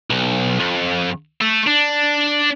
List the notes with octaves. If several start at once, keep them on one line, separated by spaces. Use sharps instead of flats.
B1
F2
A3
D4